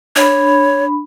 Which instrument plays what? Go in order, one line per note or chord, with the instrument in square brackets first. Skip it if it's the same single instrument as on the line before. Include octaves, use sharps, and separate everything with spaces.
[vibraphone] D4 B5 [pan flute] C#5